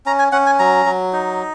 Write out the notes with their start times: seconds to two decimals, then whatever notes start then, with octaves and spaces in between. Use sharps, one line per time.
0.06 C#4 A#5
0.19 G#5
0.32 C#4 F#5
0.46 G#5
0.59 F#3 A#5
0.86 F#3
1.13 D#4